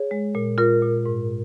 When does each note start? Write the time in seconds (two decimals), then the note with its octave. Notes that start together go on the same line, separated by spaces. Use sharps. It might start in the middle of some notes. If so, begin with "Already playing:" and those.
Already playing: G#4 C#5
0.11 G#3
0.35 A#2
0.58 A#2 F4 A#4
0.82 A#2
1.06 G#2